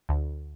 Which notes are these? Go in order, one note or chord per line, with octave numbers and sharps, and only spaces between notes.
D2